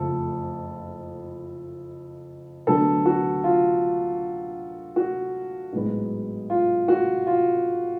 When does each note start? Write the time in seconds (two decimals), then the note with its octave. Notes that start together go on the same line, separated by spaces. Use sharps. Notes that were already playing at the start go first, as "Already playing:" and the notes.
Already playing: F#1 F2 F3 A3 A4
2.67 D2 D3 F#3 B3 A4
3.06 F#4
3.44 F4
4.96 F#4
5.73 A1 G#2 F#3 B3
6.50 F4
6.88 F#4
7.27 F4